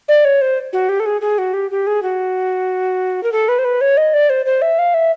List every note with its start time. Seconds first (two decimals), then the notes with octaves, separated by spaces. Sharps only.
0.09 D5
0.25 C#5
0.41 C5
0.73 F#4
0.89 G4
1.00 A4
1.06 G#4
1.21 G#4
1.38 F#4
1.54 G4
1.71 G4
1.87 G#4
2.03 F#4
3.23 A#4
3.32 A4
3.49 B4
3.59 C5
3.65 B4
3.81 C#5
3.97 D#5
4.14 D5
4.30 C5
4.46 C5
4.62 E5
4.79 F5
4.94 E5